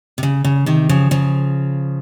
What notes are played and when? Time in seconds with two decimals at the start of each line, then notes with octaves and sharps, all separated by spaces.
0.18 C3
0.23 C#3
0.45 C#3
0.66 C3 D#3
0.89 C#3 F3
1.11 C#3 F3